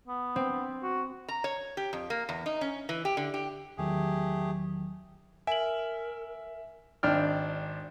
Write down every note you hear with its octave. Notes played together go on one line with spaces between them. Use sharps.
B3
C4
F#4
A#5
C#5
G4
F2
A#3
E2
D#4
C#4
E3
G4
D3
G4
E2 D#3 F#3 A3 G4 G#4
A#4 E5 G#5 F#7
G#1 D4 G5 F6